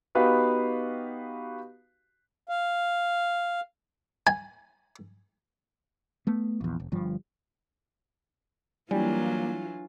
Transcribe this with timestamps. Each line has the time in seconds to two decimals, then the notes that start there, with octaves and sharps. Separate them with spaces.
0.15 B3 D#4 F#4 G4 B4 F5
2.49 F5
4.27 G#5
6.27 A3 B3
6.61 A#1 E2
6.80 F1
6.92 G1 G2 F3
8.91 E3 F#3 G3 A#3 D4 E4 F4 G#5